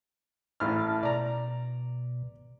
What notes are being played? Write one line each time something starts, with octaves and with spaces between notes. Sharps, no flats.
A1 A2 A5 F6
B2 D5 A#5